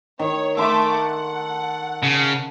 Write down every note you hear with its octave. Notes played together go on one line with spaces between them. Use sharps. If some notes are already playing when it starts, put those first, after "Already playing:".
D#3 C#5
A3 A4 E5 C6 D6
F#5
C#3